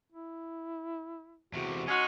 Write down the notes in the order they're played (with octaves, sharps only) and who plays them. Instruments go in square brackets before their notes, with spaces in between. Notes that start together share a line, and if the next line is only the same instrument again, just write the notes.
[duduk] E4
[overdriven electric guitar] E2 C3 [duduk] F#4
[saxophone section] G#3 C#4 F#4 [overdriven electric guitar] D#4